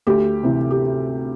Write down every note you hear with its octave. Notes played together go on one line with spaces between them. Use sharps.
D2 G4
C3 E3
G4